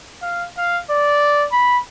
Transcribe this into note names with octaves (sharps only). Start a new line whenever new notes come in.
F5
F5
D5
B5